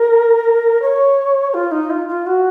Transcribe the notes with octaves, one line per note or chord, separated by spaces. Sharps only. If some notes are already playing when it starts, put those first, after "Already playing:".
Already playing: A#4
C#5
F4
D#4
F4
F4
F#4